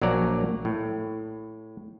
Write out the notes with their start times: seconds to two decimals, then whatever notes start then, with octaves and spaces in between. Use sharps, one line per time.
0.02 A#1 F#3 A#3 C#5 D5 A#5
0.65 A2